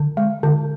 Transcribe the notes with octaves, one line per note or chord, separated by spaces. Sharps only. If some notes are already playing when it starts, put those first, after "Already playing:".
Already playing: D3
G#3
D3